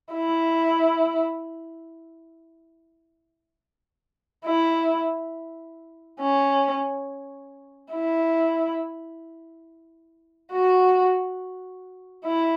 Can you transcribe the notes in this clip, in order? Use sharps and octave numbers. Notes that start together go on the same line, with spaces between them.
E4
E4
C#4
E4
F#4
E4